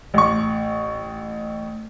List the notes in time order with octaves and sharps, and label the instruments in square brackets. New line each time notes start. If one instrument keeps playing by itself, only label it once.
[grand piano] A1 C#6